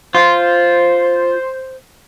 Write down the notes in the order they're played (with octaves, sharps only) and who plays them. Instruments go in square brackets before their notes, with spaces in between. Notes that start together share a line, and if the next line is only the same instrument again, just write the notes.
[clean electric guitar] F4 [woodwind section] C5